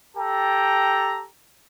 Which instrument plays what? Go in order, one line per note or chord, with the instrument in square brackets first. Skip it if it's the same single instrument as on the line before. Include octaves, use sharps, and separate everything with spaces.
[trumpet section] G4 A4 G5 A5 A#5